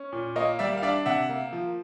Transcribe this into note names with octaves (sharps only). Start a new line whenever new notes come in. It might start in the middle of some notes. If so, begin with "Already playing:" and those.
Already playing: C#4
A#2
A#3 C#5 D#5
G3 D5 E5
F5
D4 D5 E5
C3 E5 F#5
A#3
F3